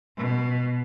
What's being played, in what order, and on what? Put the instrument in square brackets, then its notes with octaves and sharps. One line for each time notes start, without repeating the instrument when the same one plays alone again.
[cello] B2